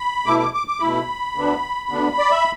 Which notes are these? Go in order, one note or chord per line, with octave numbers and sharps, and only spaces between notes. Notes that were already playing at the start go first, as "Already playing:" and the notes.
Already playing: B5
B2 A3 E4 D6
D6
D6
D6
B2 A3 E4 B5
D2 D3 B3 D4
D2 D3 B3 D4
D5
E5